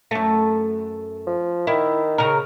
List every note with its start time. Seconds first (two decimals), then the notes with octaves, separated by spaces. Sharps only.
0.11 F#2 A3
1.26 F3
1.67 D#3 E4
2.18 C#3 A#4